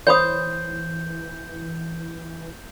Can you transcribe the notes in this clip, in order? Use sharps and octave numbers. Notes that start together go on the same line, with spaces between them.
E3 C5 C#5 B5 D#6 G6